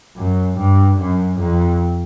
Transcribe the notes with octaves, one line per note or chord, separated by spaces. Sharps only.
F#2
G2
F#2
F2